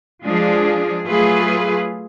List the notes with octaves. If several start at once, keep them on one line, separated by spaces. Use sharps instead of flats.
F3 G#3 D4 G#4
F#3 A3 F4 G#4 B4